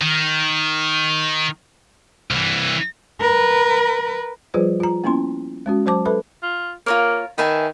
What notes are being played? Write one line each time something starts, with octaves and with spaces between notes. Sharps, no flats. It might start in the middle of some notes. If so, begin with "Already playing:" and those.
D#3
C2 E3
A#4 B4
F3 G3 F4 G#4 B4 C5
F4 A#5
A#3 B3 C#4 E4 C6
G#3 C#4 F#4
F#3 C5 A5 D6
A4 B4 E5 B5
F4
A#3 F4 A#4 C#5
D#3 B4 E5 G#5